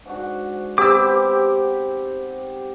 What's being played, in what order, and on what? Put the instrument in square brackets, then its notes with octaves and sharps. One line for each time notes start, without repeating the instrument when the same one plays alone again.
[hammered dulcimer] G#2 D4 F#4
[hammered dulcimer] B3 C4 C5 [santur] G4 [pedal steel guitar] D6 E6